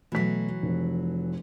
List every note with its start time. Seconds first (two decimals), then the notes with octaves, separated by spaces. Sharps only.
0.12 B2 E3 F#3 A3 B6
0.63 F1